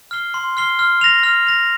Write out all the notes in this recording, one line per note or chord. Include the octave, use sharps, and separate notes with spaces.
F6 C7 G7
C6
F6 C7 G7
F6
A#6 F7
F6
A#6 F7